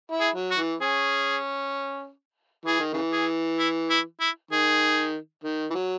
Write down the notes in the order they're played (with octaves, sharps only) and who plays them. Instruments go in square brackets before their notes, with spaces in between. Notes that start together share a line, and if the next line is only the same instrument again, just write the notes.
[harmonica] E4
[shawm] G#4
[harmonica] F#3
[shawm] F#4
[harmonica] E3
[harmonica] C#4 [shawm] G#4
[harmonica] E3 [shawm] G#4
[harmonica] D#3
C#3 E3
[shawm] G#4
E4
E4
E4
[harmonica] D#3 [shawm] G#4
[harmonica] D#3
E3
F#3